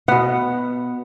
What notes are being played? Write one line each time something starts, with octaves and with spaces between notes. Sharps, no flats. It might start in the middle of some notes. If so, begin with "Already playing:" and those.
B2 B3 F#5